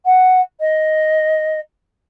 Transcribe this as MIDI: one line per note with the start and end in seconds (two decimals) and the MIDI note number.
0.05 0.41 78
0.60 1.60 75